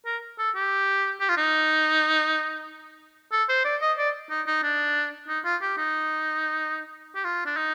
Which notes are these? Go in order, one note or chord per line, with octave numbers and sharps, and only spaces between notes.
A#4
A4
G4
G4
F4
D#4
A4
C5
D5
D#5
D5
D#4
D#4
D4
D#4
F4
G4
D#4
G4
F4
D4
D#4